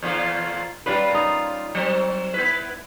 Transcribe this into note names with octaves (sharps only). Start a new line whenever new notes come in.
E2 A#2 F4
A#2 G3 C#4 F4 B4
D#4 A#4
F#3 C4
B3 E4 B4